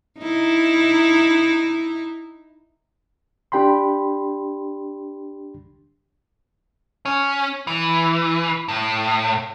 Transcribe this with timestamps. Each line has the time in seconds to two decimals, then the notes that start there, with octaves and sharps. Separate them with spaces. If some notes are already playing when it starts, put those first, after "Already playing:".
0.19 D#4 E4
3.52 D4 G4 G5 B5 C6
7.05 C#4
7.67 E3
8.68 A2